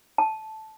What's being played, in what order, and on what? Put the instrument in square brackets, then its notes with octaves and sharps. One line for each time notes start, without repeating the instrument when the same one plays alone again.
[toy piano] A5